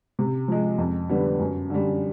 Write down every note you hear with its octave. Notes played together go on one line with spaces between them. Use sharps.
C3
F3 G#3
F2
D3 G3 B3
F#2
D3 G3